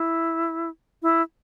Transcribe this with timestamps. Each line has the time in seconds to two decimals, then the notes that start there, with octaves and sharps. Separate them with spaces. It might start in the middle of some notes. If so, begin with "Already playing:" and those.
Already playing: E4
1.02 E4